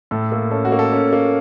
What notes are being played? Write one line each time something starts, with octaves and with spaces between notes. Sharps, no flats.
A2 A4
A#3
C#4 A4
F#4
A#3
A4
C#4
A#3